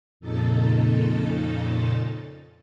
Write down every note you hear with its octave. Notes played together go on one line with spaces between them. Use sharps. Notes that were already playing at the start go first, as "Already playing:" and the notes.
F2 A#2 C#3 D#4 A4 A6